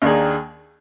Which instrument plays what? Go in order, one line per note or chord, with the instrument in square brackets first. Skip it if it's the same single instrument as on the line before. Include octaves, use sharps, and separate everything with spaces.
[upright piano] D#2 D#3 A#3 D4 G#4